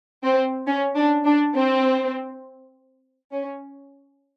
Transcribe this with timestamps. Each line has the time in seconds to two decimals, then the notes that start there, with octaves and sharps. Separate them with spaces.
0.23 C4
0.67 C#4
0.96 D4
1.26 D4
1.55 C4
3.33 C#4